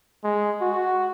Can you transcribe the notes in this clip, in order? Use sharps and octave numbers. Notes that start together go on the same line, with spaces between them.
G#3
F#4